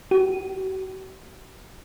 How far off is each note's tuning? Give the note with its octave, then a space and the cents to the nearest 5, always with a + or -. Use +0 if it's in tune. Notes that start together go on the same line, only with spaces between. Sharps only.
F#4 +40